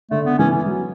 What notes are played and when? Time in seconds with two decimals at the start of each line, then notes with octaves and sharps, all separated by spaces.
0.11 D3 A3
0.26 B3
0.39 E3 C#4
0.66 F#3